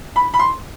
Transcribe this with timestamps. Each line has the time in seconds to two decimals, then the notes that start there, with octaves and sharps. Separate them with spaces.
0.16 B5
0.34 B5
0.39 C6